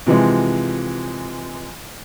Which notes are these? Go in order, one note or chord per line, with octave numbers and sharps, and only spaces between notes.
C3 E3 F3 G#3